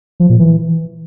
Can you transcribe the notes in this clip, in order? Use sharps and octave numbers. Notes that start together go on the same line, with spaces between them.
F3
A#2
E3